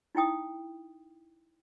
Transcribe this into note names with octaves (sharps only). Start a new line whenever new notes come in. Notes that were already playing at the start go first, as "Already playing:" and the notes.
D#4 E4 G5 D#6